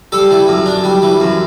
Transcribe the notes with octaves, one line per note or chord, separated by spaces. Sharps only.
G3 A4
E3
F#2
D4
G3
E3
F#2